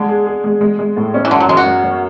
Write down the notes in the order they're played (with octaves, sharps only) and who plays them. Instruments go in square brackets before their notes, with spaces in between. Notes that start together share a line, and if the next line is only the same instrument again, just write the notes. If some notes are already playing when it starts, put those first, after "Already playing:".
Already playing: [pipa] D3 [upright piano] G#3
[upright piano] G#4
G#4
G#3
G#3
G#3
A2
C#4
[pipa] E3
[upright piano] F#2 [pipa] D3
[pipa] F#3
[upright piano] F#2 [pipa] G#3
[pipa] F#4
[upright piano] F#3
F#3